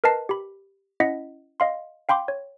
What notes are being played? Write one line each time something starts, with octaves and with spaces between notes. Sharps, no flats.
A#4 B4 D#5 A5 C7
G4 B5
C#4 E4 D#5 F#5 B6
D#5 F5 C6
F5 G5 B5 C6 D6
C#5